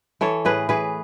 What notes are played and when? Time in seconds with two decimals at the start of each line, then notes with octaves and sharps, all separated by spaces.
0.21 E3 A4 C#5
0.45 A2 G#4 B4
0.69 E3 G#4 B4